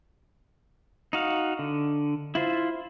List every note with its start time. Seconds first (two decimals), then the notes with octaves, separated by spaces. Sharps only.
1.13 D#4 F#4 F5
1.59 D3
2.35 E4 F4 C5